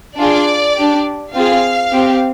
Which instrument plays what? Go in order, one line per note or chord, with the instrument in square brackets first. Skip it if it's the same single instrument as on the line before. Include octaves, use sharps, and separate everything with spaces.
[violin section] D4 F4 G#4 D5
D4 G4
C4 F4 G#4 F5
C4 G4